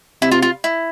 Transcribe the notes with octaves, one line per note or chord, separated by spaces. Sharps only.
C3 E4
F4
F4
E4